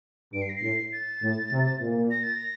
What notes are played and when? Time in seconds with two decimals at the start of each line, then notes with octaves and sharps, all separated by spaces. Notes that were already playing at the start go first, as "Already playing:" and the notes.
0.33 G2 D7
0.41 C7
0.49 A#6
0.56 C7
0.63 A2
0.92 A6
1.22 A2
1.52 C3
1.81 A#2
2.10 A#6
2.23 A6
2.35 A#6